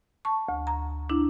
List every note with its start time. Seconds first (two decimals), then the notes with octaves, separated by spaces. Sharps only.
0.25 A5 C#6
0.49 D2
0.67 A#5
1.10 D4 E4